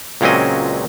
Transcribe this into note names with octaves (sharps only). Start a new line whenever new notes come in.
C#2 A#2 F#3 C4 C#4 D#5